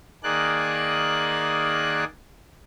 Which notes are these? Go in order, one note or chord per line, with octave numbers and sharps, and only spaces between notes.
D#3 A#3 G#4 D5 F#6